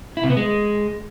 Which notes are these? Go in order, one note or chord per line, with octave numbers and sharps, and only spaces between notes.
E4
C3
B3
G#3